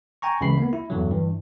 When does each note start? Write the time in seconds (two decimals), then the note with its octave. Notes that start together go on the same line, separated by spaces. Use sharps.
0.22 G5 G#5 A#5 C#6
0.41 D2 C#3 E3 G#3 B5 C7
0.58 A#3 B3
0.73 E4
0.90 E2 G2 D3 F#3
1.11 G2 E3